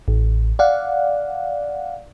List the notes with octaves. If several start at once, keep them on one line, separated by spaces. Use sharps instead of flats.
A1
D5 F5 F#5